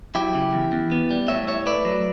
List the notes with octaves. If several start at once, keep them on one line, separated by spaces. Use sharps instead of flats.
F#3 E4 G4
C#3
E2
E2
B3
G3
A2 C#5 E5
E4 C#5 E5
A3 B4 D5
F#3